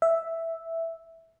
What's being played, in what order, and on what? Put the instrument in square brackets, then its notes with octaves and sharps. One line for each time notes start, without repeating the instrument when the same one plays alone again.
[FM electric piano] E5